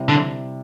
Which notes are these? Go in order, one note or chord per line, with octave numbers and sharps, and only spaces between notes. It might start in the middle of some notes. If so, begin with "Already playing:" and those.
Already playing: C3 G3 C4 E4
D3